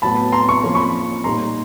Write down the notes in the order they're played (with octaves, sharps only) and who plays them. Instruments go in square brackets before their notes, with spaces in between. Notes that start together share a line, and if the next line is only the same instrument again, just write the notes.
[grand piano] A2 F#3 B3 A5 B5
A#5 C6
C#6
F3 A#3 C#4
B5 C#6
A#2 G3 A#3 D#4 A#5 C6